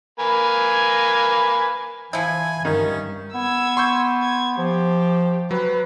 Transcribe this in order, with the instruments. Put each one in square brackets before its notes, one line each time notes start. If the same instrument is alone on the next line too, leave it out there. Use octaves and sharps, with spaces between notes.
[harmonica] A#3 B4 G#5
[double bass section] E3 [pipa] F3 E4 [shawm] G#5
[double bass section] G2 G3 [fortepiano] D#3 [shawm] C#4
[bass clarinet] B3 [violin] E6 G#6
[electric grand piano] C6 C#6 G6
[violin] G#6
[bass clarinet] F3 [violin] G4
[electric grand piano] F#3 [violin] B4